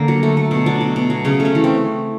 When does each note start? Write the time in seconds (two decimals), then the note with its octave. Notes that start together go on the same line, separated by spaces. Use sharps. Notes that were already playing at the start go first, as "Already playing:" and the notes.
Already playing: D3 A#3
0.08 F#3
0.23 A3
0.37 A3
0.51 B2
0.66 F#3 D4
0.81 B2
0.96 B2
1.10 F#3
1.25 C#3 C#4
1.40 A3
1.45 C#4
1.55 E3
1.64 C4